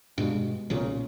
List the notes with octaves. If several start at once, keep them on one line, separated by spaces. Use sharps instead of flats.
G2 B2 G#3
B1 A#2 C#3